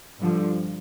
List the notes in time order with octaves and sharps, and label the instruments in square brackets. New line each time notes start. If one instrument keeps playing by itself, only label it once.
[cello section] G2 D3 F3